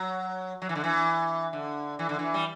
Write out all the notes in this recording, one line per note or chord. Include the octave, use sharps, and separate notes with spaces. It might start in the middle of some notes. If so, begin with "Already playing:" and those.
Already playing: F#3
F#3
E3
D3
E3
D3
E3
D3
E3
G3